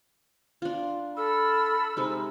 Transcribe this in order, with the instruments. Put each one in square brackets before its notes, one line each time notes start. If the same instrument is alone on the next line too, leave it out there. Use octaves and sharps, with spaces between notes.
[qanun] D4 F4
[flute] A4 [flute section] B5 F6 [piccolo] E6
[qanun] C3 G#3 D#4